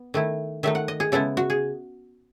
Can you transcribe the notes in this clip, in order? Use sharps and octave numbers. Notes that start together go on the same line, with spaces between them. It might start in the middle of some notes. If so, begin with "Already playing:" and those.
Already playing: B3
D#3 A3 E4
D#3 F#3 A3 D#4 E5
F#5
D#5
G#4
C#3 G#3 B3 E4 A4
F#4
G#4